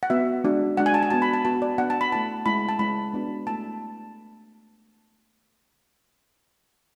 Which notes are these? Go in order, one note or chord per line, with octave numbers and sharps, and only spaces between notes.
F#5
B3 F#4 E5
G#3 D4 F#4
G#3 D4 F#4 F#5
G#5
A5
G#5
B3 F#4 A5
B5
A5
B3 F#4 A5
D5
B3 D4 F#4 F#5
A5
B5
A3 E4 A5
G#3 C#4 E4 B5
A5
G#3 C#4 E4 B5
B3 D4 F#4
A3 E4 A5